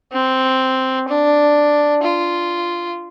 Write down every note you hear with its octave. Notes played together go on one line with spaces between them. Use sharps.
C4
D4
F4